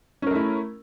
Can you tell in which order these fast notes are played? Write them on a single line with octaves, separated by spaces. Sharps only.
C#4 A#4 A3 E4